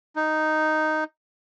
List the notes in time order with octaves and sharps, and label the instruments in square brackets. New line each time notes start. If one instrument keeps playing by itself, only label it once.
[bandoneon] D#4